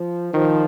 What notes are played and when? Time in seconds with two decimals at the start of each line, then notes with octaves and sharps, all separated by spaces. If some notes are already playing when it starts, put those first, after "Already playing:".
Already playing: F3
0.34 D#3 F3